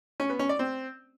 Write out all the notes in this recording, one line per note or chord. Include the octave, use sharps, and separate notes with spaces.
C#4
B3
C#4
D5
C4